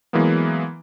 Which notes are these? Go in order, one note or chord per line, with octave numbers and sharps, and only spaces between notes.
E3 F#3 G#3 A#3 B3